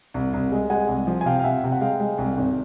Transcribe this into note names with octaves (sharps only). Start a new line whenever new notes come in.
C2
C2
G#3
G#3 F#5 G#5
C2
F3
G#5
C3 F5 G5
F5
C3 E5 F#5
C3
F#5
G#3 F5 G5
G#3
C2
G#1